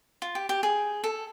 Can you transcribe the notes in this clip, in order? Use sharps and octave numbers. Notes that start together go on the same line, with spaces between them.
F4
G4
G4
G#4
A4